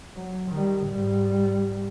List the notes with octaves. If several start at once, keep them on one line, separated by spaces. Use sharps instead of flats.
F#3
D#3 G3
G#2 G3